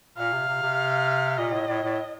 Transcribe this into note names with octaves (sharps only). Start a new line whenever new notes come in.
A#2 F5
C3
C3
C3
A#2 D#5
A2
A2
A2